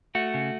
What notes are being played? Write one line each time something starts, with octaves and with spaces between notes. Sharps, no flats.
A3 F#4
C#3